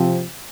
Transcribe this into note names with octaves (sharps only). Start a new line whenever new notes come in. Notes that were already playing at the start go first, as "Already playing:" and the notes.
Already playing: C3 F3 C4